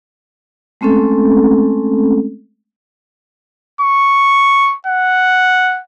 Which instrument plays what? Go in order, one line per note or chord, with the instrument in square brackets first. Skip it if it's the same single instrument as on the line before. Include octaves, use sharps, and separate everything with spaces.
[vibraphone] G#3 A3 C4 C#4 A4
[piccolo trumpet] C#6
F#5